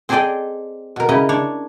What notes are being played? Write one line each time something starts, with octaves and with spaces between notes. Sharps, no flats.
C4 G#4 A4 D5 D#5 G5
B2 A#4
C#3 E4 D#5
D4 C#5